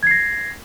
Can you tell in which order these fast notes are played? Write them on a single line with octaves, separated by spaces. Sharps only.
G#6 C7 A#6